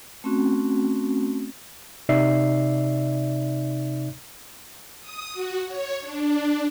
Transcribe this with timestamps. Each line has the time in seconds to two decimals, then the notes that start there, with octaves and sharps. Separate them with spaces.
0.24 A3 C4 C#4 F#4
2.09 C3 D#4 D5 E5 C7
5.01 D#6
5.33 F#4
5.68 C#5
6.01 D4